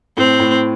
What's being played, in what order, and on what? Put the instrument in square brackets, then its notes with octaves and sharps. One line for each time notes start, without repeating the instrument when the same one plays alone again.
[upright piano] A2 [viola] C4
[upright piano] A2